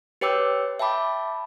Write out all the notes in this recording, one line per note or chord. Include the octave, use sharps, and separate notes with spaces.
G4 B4 C#5 G5 D6 E6
E5 G5 A5 B5 D6